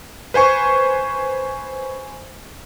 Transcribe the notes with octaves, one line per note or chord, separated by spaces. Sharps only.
B4 C5 G#5 C#6